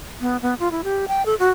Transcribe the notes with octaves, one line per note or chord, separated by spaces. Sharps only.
B3
B3
F4
E4
G4
G5
A4
F#4